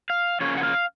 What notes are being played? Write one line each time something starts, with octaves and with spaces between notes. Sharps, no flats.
F5
C#3 F3 A#3 C#4 C#5
F#5
F5